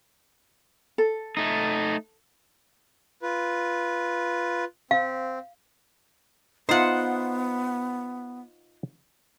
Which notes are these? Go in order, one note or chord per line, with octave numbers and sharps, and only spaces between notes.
A4
A3 D#4
F4 B4
C4 F5
B3 D#4 F4 C5 E5 F#5